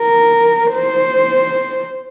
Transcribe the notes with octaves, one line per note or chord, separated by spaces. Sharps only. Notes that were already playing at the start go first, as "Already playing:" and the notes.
Already playing: A#4
C5